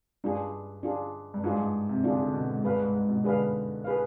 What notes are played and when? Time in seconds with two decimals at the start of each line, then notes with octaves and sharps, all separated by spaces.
0.24 G2 D4 F4 G#4
0.83 D4 F4 G#4
1.34 G2
1.44 G#2 D4 F4 G#4
1.59 G2
1.89 C3
2.04 D3 D4 F4 G#4
2.19 D3
2.34 B2
2.49 G#2
2.64 G2 G#4 B4 F5
2.79 G#2
2.94 G#2
3.09 B2
3.24 D3 G#4 B4 F5
3.84 G#4 B4 F5